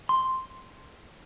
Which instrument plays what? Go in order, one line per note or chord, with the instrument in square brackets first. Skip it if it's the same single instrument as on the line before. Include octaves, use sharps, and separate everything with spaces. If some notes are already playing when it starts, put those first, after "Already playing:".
[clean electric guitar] C6